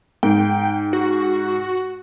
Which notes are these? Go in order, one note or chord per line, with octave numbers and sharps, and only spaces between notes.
G#2 G5
F#4